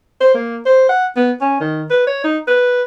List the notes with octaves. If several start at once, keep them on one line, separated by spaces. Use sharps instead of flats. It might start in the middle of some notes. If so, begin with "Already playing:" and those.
C5
A#3
C5
F#5
B3
C#4
D#3
B4
C#5
D#4
B4